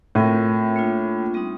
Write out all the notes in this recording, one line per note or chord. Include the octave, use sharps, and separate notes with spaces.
A2 C4 F4 A#4
A#3 D4 F4
G3 C4 D#4